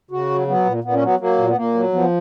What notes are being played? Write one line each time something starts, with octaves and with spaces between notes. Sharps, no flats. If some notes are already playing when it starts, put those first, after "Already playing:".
C#3 F#4
F#3
F#3 B3
A#2
A#2 B3
C#4
F#3 B3
F#3 A#3
A#2
B3
A#2 A#3
F#3
F3 B3